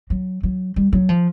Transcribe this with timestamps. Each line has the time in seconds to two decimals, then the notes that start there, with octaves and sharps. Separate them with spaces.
0.10 F#3
0.43 F#3
0.76 G3
0.93 F#3
1.09 F3